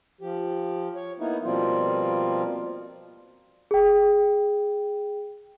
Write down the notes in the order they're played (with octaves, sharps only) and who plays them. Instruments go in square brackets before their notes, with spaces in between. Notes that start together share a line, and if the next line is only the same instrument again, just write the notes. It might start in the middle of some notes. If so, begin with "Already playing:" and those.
[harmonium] F3 G4
C#5
A#3 B3 D#4 E4
B2 F3 G3 A#3 C4 F4
[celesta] G#4 G5